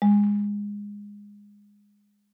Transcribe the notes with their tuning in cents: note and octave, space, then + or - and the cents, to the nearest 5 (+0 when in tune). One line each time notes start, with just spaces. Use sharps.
G#3 -20